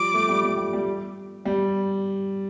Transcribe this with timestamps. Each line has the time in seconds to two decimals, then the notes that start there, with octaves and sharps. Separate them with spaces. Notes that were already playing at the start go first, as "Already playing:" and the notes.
Already playing: F3 G3 D6
0.14 A3
0.29 G3
0.44 G3
0.57 G3
0.73 G3
1.45 G3